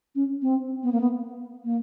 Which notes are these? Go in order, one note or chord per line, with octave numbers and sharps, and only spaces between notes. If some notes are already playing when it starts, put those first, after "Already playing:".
C#4
C4
B3
A#3
B3
A#3